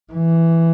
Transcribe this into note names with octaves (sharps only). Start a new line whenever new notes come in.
E3